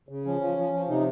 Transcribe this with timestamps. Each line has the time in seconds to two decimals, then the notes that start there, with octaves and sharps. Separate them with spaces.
0.09 C#3
0.25 F3 C#4
0.41 F3
0.57 F3
0.73 F3
0.89 C3 D#4